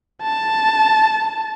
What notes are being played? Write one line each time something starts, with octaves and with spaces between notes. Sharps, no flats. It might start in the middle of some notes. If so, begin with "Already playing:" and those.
A5